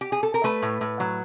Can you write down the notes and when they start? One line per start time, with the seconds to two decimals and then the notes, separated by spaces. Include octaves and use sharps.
0.01 G4
0.12 G#4
0.23 A4
0.34 A#4
0.44 A3 B4
0.62 A2
0.81 A2
1.00 F#3